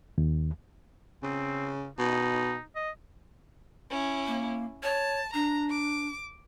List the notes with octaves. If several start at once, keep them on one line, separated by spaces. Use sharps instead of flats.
D#2
C#3 C4
B2 D#4
D#5
C#4 E4
A#3
C#5 A5
D4 A#5
D6